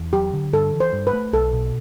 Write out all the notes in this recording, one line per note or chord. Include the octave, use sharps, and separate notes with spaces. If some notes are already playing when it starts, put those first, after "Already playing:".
Already playing: E2
F#3 G4
D3
G2 A4
E3
C5
G2
B4
A3
B1 A4
B2